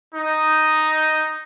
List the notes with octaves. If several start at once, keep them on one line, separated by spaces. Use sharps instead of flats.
D#4